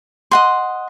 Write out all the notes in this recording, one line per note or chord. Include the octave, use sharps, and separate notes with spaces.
D#5 F#5 C6